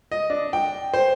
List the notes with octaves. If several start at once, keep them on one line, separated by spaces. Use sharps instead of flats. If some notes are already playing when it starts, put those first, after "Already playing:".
D#5
D4
G5
C5